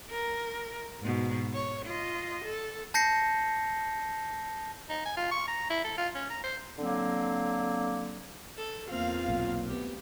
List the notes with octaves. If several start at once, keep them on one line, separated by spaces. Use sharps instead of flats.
A#4
G#2 B2
C#5
F4 D#5
A4
A5 G6 A#6 C7 C#7
D#4
G#5
F4
C#6
A#5
E4
A4
F4
C#4
A#5
C5
D3 F#3 A#3 C4
A4
E2 A#3 C4 F4 F5
B1 A#2
D2 B3 G4